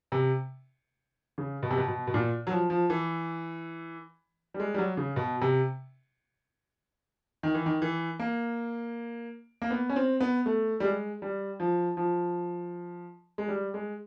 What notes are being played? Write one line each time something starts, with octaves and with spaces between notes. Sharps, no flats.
C3
C#3
B2
C3
B2
B2
B2
A#2
F#3
F3
F3
E3
G3
G#3
G3
F#3
C#3
B2
C3
D#3
E3
D#3
E3
A#3
A#3
B3
C#4
C4
B3
A3
G3
G#3
G3
F3
F3
G#3
G3
G#3